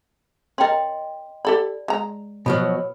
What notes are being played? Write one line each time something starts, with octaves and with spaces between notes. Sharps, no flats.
C#4 A#4 D#5 G5 C6
G4 A4 D5 B5
G#3 A#5
B2 F3 F#3 B4 B5